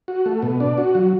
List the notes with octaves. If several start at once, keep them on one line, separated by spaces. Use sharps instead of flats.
F#4
A3
B2
D4
F#4
F#3